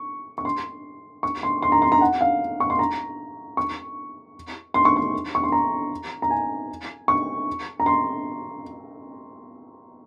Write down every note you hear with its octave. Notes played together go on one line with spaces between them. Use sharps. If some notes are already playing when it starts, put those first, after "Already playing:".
Already playing: C#6
C#6
C6
C#6
C6
C6
A#5
C6
A#5
F#5
F5
C#6
C6
A#5
C#6
C6
C#6
C6
C#6
C6
A#5
A#5
G#5
C#6
A#5
C6